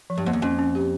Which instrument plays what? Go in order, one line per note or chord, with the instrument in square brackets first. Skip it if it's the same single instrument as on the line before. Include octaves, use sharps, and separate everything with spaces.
[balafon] F3
[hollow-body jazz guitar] G2
[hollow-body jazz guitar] F2 [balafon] A#3
[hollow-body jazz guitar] E2
[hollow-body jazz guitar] F2 [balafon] C#4
[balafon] C#4
G4